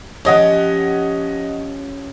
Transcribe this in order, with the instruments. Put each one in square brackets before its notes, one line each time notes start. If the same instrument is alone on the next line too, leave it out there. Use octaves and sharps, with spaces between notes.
[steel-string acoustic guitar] F3 C#4 G4 [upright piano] C#5 D#5 F#5